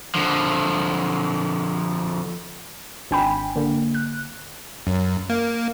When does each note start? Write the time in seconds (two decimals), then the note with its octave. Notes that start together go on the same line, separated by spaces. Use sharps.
0.15 D3 F3
3.11 G#1 D4 G5 G#5 B5 B6
3.56 D3 A#3
3.95 F#6
4.87 F#2
5.30 A#3